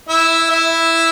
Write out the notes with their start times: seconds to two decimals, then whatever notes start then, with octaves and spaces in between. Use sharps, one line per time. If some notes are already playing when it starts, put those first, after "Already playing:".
0.09 E4 E5
0.50 E4 E5